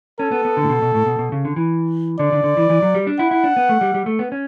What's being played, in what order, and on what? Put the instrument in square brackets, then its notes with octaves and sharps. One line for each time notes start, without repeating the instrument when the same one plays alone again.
[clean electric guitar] C#4 [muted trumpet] A4
[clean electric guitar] B3
B3
D3
A2
B2
B2
A2
B2
B2
C#3
D3
E3
[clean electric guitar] D3 [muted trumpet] D5
[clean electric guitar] D3
D3
E3
E3
F#3
G3
D4
[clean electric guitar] E4 [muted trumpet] F#5
[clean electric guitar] E4
D4
B3
A3
G3
G3
A3
B3
C#4